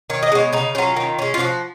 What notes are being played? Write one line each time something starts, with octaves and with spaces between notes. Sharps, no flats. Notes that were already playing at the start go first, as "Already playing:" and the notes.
D#3 C#5
D#5
G#3 B3 C#5
C#3 D#4
F#3 C#4 F4
D#3
G#3 C#4
F4
F3 F#4